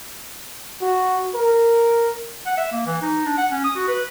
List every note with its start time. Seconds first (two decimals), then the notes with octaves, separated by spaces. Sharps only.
0.82 F#4
1.35 A#4
2.46 F#5
2.57 E5
2.72 A#3
2.87 E3
3.02 D#4
3.26 D4
3.38 F#5
3.52 C#4
3.64 D#6
3.75 F#4
3.88 B4